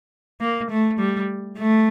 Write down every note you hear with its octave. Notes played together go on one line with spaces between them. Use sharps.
A#3
A3
G3
A3